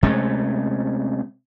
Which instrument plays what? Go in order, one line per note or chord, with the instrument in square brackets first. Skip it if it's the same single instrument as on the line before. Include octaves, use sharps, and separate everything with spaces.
[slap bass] C3 G#3 A3 C#4